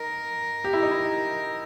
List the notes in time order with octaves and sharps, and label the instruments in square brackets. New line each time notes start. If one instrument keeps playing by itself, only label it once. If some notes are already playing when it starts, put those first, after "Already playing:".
Already playing: [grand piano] D#4 [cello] A#4
[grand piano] G4
E4
D#4
E4